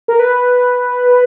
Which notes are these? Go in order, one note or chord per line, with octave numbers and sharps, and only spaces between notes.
A#4
B4